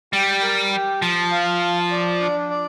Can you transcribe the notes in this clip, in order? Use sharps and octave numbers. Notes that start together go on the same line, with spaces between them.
G3 G4
A#4
G4
F3 A5
F5
A5
D5
D4
D5